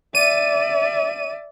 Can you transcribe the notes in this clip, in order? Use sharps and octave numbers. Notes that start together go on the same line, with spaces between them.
D5 E5 D#7